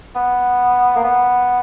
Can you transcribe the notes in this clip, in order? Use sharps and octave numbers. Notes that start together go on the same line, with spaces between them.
B3
A#3
B3